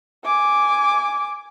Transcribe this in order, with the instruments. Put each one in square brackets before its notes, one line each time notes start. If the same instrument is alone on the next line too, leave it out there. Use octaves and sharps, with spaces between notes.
[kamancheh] G#5 D6